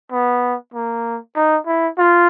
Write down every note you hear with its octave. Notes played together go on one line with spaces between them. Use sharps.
B3
A#3
D#4
E4
F4